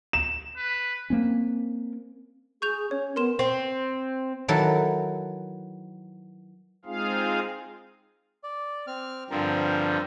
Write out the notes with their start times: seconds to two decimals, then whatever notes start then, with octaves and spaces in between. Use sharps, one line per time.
0.13 E7
0.57 B4
1.10 A#3 C4 C#4
2.62 G#4 C#6 G6 F7
2.91 C#4 C#5
3.16 B3 A#4 C6 E7
3.39 C4
4.48 D#3 E3 F#3 A4
6.85 G#3 C4 D#4 F4 G#4 F5
8.43 D5
8.87 C4 F6
9.30 G2 D3 F3 C4 A#4